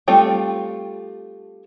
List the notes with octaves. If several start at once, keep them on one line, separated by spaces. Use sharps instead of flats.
G3 A3 C4 F4